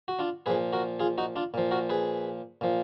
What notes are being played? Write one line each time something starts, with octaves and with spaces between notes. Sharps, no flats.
F#4
D4 F4
A#2 F3 G#4 B4
F#4 A#4
F4 G#4
D#4 F#4
D4 F4
A#2 F3
F#4 A#4
G#4 B4
A#2 F3